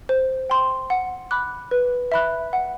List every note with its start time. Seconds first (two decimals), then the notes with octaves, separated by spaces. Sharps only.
0.09 C5
0.50 G5 C6
0.90 F#5
1.31 B5 D6 F#6
1.71 B4
2.12 E5 B5 F#6
2.53 F#5